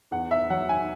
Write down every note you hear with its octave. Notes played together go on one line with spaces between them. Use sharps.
E2 F#5
E5
F#3 F#5
G#5